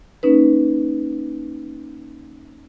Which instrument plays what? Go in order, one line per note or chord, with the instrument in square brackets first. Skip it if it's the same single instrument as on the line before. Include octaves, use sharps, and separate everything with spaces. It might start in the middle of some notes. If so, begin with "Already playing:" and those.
[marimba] A#3 C#4 D#4 B4